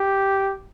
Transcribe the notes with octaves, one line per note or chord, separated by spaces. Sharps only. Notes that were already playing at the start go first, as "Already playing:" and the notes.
Already playing: G4